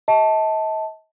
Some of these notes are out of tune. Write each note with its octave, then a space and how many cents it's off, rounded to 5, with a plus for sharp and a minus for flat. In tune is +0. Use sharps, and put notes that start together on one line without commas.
D#5 +40 A5 +0